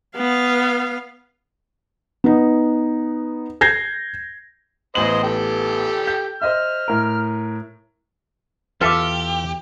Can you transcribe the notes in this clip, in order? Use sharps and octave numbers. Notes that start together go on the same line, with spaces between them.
B3 F5
B3 D#4
G6 G#6 A#6 C7
A1 B3 C5 D#5 F#7
G4 A4 G5
G6
C5 D#5 E5 F6
A2 A#4
E2 E3 F4 G4 A4 B4 E5 D6